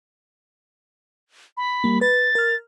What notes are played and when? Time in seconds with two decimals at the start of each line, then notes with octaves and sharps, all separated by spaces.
1.57 B5
1.84 G3 A#3
2.01 B4 A6
2.35 A#4 F6